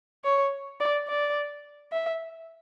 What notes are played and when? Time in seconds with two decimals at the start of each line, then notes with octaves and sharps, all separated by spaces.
0.24 C#5
0.80 D5
1.08 D5
1.92 E5